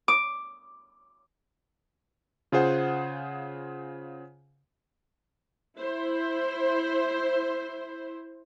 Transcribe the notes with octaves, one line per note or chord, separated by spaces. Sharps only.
D6
C#3 F4 G#4 C5 F#5
E4 C5